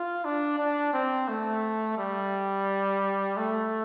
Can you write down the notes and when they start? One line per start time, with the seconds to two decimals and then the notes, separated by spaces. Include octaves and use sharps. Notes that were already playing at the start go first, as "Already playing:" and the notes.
Already playing: F4
0.25 D4
0.59 D4
0.93 C4
1.28 A3
1.98 G3
3.37 A3